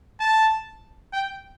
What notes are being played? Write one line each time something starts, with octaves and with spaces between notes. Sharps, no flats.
A5
G5